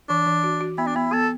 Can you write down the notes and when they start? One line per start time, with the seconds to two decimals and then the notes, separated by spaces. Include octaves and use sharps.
0.09 E3 D4
0.27 E3
0.44 F#4
0.61 F#4
0.78 B3 E4
0.87 D4
0.96 B3 E4
1.13 B3 A4